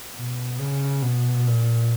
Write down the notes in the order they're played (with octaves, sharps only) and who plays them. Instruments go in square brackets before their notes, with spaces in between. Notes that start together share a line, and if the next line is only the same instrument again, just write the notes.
[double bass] B2
C#3
B2
A#2